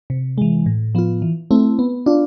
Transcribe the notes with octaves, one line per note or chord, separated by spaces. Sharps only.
C3
E3 G#3
A2
F3 B3 F4
E3
A3 C4 E4
B3
D4 F4